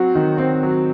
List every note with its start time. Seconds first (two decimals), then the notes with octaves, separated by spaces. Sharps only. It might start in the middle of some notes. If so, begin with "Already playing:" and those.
Already playing: F#3 C4 F#4
0.15 D#3
0.38 C4
0.63 F#3